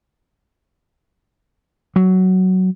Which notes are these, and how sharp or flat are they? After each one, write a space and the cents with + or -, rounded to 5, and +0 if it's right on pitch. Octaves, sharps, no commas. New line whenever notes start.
F#3 +10